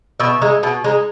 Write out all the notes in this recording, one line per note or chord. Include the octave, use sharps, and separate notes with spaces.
B2 E5
G#3 D#4
B2
G#3 D#4